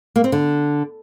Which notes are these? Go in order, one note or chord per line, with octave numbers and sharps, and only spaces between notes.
A#3
C4
D3